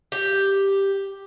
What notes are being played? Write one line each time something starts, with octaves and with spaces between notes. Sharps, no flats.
G4